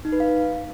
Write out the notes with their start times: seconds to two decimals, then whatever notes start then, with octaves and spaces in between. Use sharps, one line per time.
0.05 D#4
0.12 B4
0.20 F5